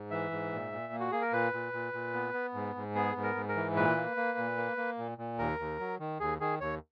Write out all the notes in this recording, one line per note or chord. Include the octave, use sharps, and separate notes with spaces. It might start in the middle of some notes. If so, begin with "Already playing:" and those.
Already playing: G#2
E3 E5
G#2
A#2
A#2
A#3
F#4
A#3 G#4
A#4
A#2 B4
A#2
A#2
A#2
B3
B3
G#2
G#2
B3 G#4
G#2
A#4
G#2
A#4
E3
A#2 B4
A#3
A#3
A#2
A#3
A#3
A#2
A#2
D#2 A#4
D#2
F#3
D#3
D#2 G#4
D#3 G#4
D#2 C#5